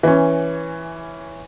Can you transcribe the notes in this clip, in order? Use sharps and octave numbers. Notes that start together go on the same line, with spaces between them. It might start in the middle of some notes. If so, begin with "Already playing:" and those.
E3 C#4